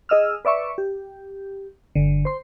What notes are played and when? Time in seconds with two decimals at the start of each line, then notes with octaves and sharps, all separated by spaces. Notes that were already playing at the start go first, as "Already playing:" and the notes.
0.09 G#4 D#5 E6 F6
0.45 B4 D5 E5 C#6
0.78 G4
1.95 G1 D3
2.25 C5 C6